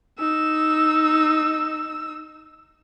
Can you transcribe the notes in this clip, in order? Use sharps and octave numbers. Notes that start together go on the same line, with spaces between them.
D#4 E6